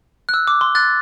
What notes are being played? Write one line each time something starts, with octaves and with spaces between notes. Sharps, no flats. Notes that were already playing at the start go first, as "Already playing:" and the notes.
F#6
E6
D6
C6
F#6 A6